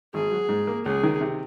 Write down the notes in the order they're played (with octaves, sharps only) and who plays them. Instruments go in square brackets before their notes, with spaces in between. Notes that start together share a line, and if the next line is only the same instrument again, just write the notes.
[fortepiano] G#1 [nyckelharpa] G#4
[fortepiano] F#3
G#2
A#3
[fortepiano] C#2 [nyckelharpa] G#4
[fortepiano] D#3
C3